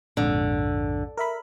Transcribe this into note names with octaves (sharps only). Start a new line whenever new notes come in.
A#1 F2 G#2 D3
A#4 E5 B5